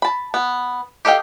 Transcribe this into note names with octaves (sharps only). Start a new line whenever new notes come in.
A5 B5
B3
G4 A4 D#5 F5 G5